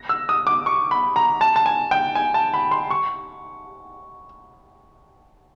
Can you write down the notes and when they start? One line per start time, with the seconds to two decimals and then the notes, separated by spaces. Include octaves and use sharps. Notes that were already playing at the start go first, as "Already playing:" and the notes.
Already playing: A#6
0.09 E6
0.29 D#6
0.47 D6
0.66 C#6
0.91 B5
1.16 A#5
1.41 A5
1.56 A5
1.66 G#5
1.91 G5
2.15 G#5
2.34 A5
2.54 B5
2.71 C6
2.91 C#6